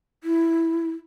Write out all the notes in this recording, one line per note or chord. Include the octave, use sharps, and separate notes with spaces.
E4